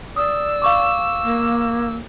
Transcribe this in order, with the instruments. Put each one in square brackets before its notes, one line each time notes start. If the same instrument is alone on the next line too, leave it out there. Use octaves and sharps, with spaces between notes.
[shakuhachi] D5 [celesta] D#6 [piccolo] E6
[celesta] F5 C#6 D6
[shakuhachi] A#3